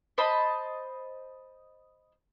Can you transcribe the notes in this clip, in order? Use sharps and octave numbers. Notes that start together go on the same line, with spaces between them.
C5 D#5 A5 B5